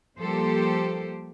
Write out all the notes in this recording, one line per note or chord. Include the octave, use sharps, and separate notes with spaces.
F3 G3 A#3 G4 A4 C5